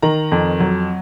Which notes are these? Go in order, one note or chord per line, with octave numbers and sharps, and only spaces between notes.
D#3 A#5
F2
F#3